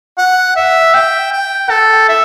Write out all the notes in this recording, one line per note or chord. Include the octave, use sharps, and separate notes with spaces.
F#5
E5
G5
G5
A4
E5